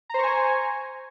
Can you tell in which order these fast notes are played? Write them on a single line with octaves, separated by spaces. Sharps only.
A#5 C5 C#6 G#5